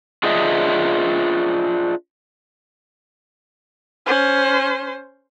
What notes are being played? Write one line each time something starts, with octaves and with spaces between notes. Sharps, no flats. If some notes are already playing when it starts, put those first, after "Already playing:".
D4 F4 G#4 C5 D#5 E5
C#4 C5